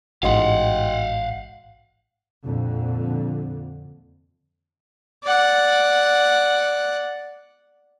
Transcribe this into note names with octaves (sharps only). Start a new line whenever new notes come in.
A1 G#2 F#4 D#5 F5 F#5 C6
F2 A#2 D3
D5 F#5